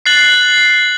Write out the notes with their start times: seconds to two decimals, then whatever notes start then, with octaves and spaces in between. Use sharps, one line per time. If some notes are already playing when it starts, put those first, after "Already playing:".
0.06 F#6 A6 C7 F#7